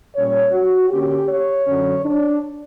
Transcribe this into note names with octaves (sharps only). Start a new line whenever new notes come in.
A#2 G3 C#4 C#5
F#4
D3 A#3 C#4 G4
C#5
F#2 D3 F#3 C#4
D4